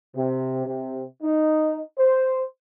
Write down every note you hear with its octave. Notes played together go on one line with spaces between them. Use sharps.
C3
C3
D#4
C5